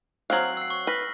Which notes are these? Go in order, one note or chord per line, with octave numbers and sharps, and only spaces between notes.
F#3 C4 F5 F#6 C7 F#7
E6 C7
C#6
B4 F6 A#6 B6